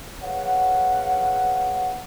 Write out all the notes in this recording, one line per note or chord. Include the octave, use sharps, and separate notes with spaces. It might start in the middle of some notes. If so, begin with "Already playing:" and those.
G#4 B4 C#5 F5 F#5